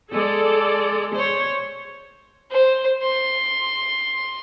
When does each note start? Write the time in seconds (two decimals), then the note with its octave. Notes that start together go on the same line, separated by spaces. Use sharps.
0.12 G#3 A4 D5
1.15 C5 C#5
2.51 C5
3.03 C6